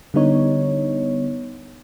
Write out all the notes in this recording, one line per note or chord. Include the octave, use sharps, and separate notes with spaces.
D3 G3 B3 D#4 C#5